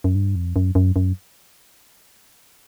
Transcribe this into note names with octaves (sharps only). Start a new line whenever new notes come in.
F#2
G2
F2
F#2
F#2
F#2